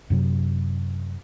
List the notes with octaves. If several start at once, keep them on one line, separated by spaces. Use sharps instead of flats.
F#2 C3 F#3